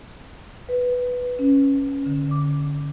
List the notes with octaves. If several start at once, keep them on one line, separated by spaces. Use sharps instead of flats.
B4
C#4
D3
D6